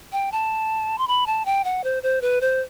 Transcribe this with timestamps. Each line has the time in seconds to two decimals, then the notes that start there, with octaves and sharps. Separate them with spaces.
0.12 G5
0.32 A5
0.98 C6
1.08 B5
1.26 A5
1.45 G5
1.64 F#5
1.84 C5
2.03 C5
2.22 B4
2.41 C5